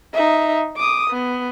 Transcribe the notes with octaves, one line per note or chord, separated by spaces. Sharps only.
D#4 E5
D6 D#6
B3